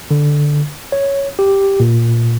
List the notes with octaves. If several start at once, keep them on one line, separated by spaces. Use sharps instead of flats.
D3
C#5
G4
A#2